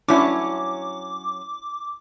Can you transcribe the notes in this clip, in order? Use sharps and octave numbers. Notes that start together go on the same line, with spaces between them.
F#3 C#4 D4 E4 D6